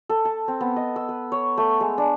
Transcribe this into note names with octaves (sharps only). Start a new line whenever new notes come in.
A4
A5
C4
B3
D#5
E6
B4
C#5
A3
G#3
D4